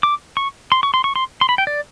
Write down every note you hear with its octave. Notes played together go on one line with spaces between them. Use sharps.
D6
C#6
C6
C#6
C6
C#6
C6
C6
B5
G5
D5